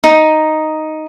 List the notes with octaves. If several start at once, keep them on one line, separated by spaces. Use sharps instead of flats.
D#4